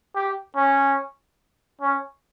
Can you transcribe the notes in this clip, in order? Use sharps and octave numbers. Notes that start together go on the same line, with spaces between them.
G4
C#4
C#4